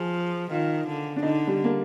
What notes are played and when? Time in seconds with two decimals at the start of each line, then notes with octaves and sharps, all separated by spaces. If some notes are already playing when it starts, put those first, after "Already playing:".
Already playing: F3 G#4
0.51 D#3 F4
0.87 D3
1.16 D4
1.23 D3 D#4
1.47 G3
1.64 A#3